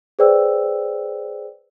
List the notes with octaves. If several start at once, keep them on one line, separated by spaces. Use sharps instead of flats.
G#4 B4 C5 D5 G5 E6